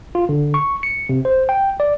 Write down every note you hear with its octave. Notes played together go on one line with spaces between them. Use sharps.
F4
D3
C#6
C#7
C3
C5
G5
D5